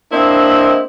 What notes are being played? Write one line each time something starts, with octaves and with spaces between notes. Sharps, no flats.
A#3 C4 D4 E4 C5 D#5